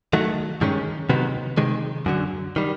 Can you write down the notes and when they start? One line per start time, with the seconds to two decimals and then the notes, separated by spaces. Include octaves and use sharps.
0.13 D#3 F#3 A3
0.61 G2 D#3 G#3 C#4
1.09 C3 D#3 F#3 B3
1.58 C3 D#3 G#3
2.06 F#2 D3 F#3
2.56 D#3 G3